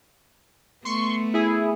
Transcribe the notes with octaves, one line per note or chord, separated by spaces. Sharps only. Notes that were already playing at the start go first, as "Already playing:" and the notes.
A3 B3 C6 C#6
E4 G#4